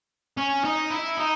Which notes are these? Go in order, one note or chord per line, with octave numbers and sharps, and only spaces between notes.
C#4
D#4
E4
D#4